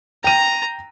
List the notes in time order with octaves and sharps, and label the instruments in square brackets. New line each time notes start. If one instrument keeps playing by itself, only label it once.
[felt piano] G5 D#7 [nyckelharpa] A#5